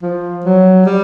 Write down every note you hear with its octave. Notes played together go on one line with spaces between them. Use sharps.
F3
F#3
G3